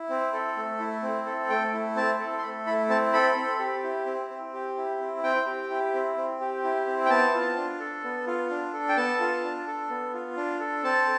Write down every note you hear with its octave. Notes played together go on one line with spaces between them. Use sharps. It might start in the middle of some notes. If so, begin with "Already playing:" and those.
Already playing: E4
C4
A4
A3
E4
C4
A4
A3 G5
E4
C4 A5
A4
C6
A3 B5
E4 B5
C4 A5
A4 B5
C4
G4
E4
C4
C4
G4
E4
C4
C4 G5
G4
E4
C4
C4
G4
E4
C4
G5
B3 A5
F4
D4
A4
B3
F4
D4
A4
G5
B3 A5
F4
D4
A4
B3
F4
D4
A4
C4 A5